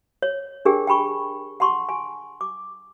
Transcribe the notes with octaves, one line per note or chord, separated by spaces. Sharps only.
C#5
D4 G4 G#4 A#4 G5
G5 G#5 B5 C#6
F#5 A5 C6 C#6
G#5
D6